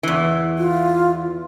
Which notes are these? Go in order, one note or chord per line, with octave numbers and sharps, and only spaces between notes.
E2 E3
F4